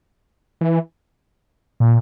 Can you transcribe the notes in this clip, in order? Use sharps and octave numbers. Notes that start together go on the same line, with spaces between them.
E3
A#2